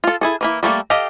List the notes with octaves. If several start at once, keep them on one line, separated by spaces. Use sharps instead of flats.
F4 A4
E4 G#4 A4
E3 A#3 E4
G3 A3 A#3 A4
G4 A4 D#5 F5